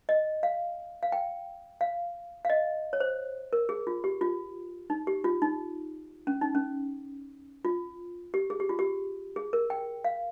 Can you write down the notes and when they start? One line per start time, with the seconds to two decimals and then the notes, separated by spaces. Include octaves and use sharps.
0.09 D#5
0.43 F5
1.03 F5
1.12 G5
1.81 F5
2.45 F5
2.50 D#5
2.93 C#5
3.00 C5
3.53 A#4
3.69 G#4
3.87 F4
4.04 G4
4.21 F4
4.90 D#4
5.07 G4
5.24 F4
5.42 D#4
6.27 C#4
6.41 D#4
6.55 C#4
7.65 F4
8.34 G4
8.50 G#4
8.60 G4
8.69 F4
8.79 G4
9.36 G#4
9.53 A#4
9.70 G5
10.05 F5